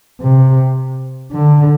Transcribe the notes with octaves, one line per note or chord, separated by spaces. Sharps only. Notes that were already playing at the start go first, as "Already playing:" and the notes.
C3
D3